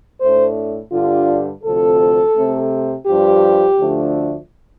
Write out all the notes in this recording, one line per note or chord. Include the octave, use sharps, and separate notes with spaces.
A2 A3 D4 C5
G2 D3 G3 D4 F4
D2 C3 F3 C4 A4
C3 A3 C4
G2 F3 D4 G4
D2 D3 F3 A3 D4